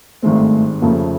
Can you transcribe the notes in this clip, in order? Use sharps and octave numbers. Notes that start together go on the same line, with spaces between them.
G#1 G2 D#3 G#3 A3 C4
F1 F2 C#3 F3 A3 A#3